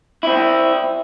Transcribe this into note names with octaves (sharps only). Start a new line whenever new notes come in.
C4 E4